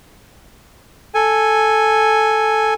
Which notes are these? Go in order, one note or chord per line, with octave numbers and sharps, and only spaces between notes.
A4 G#5